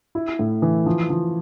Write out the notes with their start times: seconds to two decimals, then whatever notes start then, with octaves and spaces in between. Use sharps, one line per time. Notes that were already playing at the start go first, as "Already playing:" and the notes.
0.15 E4
0.39 A2
0.62 E3
0.86 F3
1.10 F3